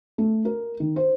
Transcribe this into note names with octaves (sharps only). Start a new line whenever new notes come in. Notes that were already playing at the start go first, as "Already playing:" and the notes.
A3
A#4
D#3
C5